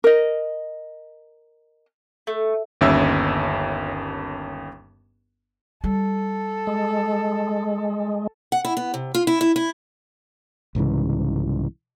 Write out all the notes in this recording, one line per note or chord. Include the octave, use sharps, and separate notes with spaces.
A#4 D#5
A3
G1 D#2 C#4 E5 E6
G3 A4
G#3
F#5
E4
B3
C3
F4
E4
E4
E4
C2 G#2 C#3 E3